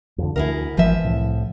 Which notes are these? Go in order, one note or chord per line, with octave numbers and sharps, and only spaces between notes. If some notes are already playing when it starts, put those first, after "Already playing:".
F2 D3
D2 E4 G#4 A#4
G#1 E3 F3 E5
C2 A2